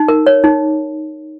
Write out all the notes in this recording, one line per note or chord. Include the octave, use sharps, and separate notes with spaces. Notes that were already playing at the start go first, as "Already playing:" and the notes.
Already playing: D#4
A#4
C#5
D#4